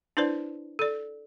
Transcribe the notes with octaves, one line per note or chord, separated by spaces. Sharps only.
D4 E4 B4 C5 D5
A4 D5